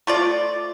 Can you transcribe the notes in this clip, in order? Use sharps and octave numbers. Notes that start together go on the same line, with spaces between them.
A3 F4 D5